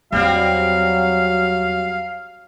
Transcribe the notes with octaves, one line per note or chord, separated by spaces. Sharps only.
E2 F#3 G3 C4 F4 F#4 F5